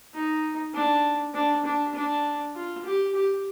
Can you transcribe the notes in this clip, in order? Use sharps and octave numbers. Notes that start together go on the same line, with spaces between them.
D#4
D4
D4
D4
D4
F4
G4
G4